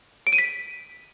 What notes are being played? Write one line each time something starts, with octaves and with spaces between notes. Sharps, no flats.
D7
D#7
B6